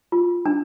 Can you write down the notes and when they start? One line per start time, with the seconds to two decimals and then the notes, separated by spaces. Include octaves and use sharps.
0.12 F4
0.46 D4